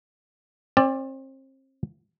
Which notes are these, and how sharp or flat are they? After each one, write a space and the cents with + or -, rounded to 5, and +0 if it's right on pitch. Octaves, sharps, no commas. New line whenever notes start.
C4 +35 D5 +0